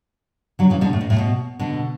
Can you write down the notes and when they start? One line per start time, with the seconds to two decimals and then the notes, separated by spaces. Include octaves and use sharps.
0.59 D3 F#3
0.70 C#3 E3
0.81 B2 D3
0.93 A2
1.01 B2
1.10 A2
1.18 B2
1.59 B2 D3